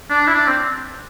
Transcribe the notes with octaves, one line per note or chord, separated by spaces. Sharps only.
D4
E4
D4
C4